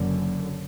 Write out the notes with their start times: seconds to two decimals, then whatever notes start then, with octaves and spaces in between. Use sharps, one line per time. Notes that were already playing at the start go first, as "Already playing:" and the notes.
Already playing: F#1 F#2 D3